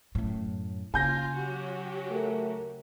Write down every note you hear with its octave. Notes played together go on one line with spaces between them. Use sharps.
F#2 A2
C#3 F4 G#5 G6 A#6
F#3 F#4 G4
A3 A#4